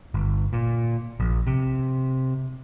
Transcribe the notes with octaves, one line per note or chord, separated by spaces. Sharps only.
G1
A#2
A#1
C3